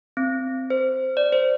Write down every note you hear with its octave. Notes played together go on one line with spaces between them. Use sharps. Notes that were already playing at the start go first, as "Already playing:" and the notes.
C4
C5
D5
C5